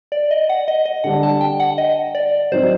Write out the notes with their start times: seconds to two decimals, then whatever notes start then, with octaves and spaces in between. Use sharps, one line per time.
0.12 D5
0.31 D#5
0.49 F#5
0.68 D#5
0.86 D#5
1.04 D3 G3 D4 F#5
1.23 A5
1.41 G5
1.60 F#5
1.78 D#5
2.15 D5
2.52 F#3 C4 D#4 C5